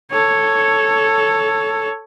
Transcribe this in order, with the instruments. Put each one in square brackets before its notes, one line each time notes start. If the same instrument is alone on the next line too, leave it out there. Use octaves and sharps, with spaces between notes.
[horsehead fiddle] A4 C#5